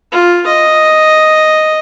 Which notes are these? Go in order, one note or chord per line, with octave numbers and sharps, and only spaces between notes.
F4
D#5